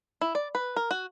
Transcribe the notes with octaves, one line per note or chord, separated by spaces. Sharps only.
E4
D5
B4
A#4
F#4